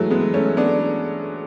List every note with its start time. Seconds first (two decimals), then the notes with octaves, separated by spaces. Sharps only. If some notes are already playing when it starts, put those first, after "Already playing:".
Already playing: E3 F#3 G#3 A3
0.11 G#3 B3
0.34 A3 C#4
0.57 B3 D4